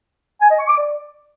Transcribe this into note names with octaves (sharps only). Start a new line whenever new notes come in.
G#5
D#5
C#6
D6
D5